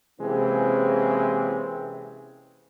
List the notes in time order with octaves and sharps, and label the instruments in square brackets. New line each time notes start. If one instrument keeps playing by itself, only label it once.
[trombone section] C3 E3 G#3 A#3 C4 C#4